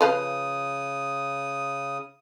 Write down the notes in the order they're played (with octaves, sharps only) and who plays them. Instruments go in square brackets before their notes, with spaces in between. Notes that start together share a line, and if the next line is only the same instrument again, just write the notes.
[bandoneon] C#3 D#6 [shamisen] F3 B4 F5